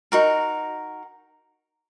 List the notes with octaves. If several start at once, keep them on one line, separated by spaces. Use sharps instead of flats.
D#4 F#4 A#4